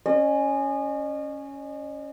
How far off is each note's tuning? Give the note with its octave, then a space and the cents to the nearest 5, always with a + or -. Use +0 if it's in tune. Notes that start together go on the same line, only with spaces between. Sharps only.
C#4 +0 D#5 -40